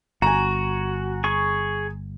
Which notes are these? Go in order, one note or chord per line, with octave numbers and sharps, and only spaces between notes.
G1 F#4 G#5 A#5
G#4 C#6